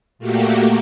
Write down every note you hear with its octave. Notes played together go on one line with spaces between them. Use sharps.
A#2 A3 A#3 F#4 G4